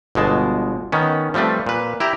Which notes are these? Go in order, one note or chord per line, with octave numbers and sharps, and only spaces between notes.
G1 B2 G#3 A5
D#3 B3 C#4
F3 G3 A3 C4 B4
A#2 B4
E4 G4 A#5